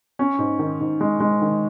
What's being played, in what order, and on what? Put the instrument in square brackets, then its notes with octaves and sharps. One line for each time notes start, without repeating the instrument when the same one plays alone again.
[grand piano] C#4
G#2
D#3
G#2
G#3
G#3
D#3